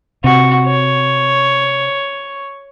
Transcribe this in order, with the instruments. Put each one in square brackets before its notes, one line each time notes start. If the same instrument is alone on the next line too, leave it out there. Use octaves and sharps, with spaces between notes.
[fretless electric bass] C3 [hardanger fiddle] F#4
[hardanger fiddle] C#5